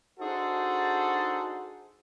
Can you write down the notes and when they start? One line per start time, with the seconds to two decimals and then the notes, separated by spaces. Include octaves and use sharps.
0.20 D4 D#4 F#4 G#4 A4 C5